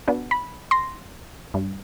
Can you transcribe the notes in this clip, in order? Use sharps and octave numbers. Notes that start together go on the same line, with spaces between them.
B3 D4 F#4
B5
C6 A#6
G2